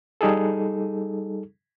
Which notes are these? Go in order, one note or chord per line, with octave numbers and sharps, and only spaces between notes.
G3 D#4 G#4 A4